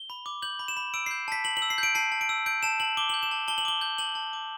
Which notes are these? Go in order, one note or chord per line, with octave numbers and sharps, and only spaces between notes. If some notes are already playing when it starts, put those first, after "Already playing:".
Already playing: G7
B5
D6
G6 F#7
B5
E7
B5
E6 D7
G6 C7
A5 B6
A5 F#7
F#7
E6
C7
G6 D7
A5 C7
A5
D7
E6
G6 D7
A5 E7
A5 F#7
D6 G7
G6 F#7
E7
A5
A5 G7
F#7
D6 G7
G6
A5 F#7
A5
D6